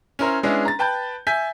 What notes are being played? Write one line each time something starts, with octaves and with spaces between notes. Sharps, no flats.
C#4 E4 A#4 C5 C#5
G#3 B3 C#4 D4 E4 G#4
A#5 A6
B4 G5 A5 B5 G6
E5 G#5 G6 B6